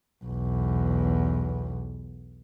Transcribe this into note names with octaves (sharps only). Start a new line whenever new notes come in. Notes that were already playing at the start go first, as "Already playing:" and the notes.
B1 E2